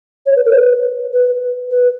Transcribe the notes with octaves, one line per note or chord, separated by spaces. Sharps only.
C#5
B4
A#4
C#5
B4
B4
B4